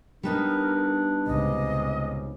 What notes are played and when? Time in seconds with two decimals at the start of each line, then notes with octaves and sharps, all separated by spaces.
0.23 G3 B3 D4 D#4 A#4
1.27 C#2 C3 D#5